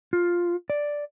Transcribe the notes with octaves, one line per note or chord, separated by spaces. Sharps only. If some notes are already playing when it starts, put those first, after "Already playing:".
F4
D5